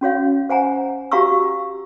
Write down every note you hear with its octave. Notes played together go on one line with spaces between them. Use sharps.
C#4 F#4 C#5 F5
C5 F#5 G#5 A#5
F#4 G4 F5 A#5 C#6 E6